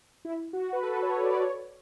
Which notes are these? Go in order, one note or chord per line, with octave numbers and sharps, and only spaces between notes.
E4
F#4
B4
A4
C#5
D5
C#5